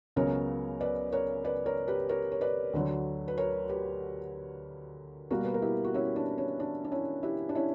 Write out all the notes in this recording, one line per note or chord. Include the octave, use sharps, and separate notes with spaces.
C#2 C#3 F#3 B3 A#4 C#5
B4 D5
A#4 C#5
B4 D5
A#4 C#5
G4 B4
A#4 C#5
C#5
B4 D5
D2 D3 F#3
B4
A#4 C#5
G4 B4
B2 G3 A#3 F#4 A#4
B4
A#4
E4 G4
F#4
C#4 E4
D4
C#4
D4
D4
C#4 E4
E4 G4
D4
C#4 E4